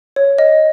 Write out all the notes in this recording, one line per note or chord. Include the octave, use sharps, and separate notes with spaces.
C#5
D#5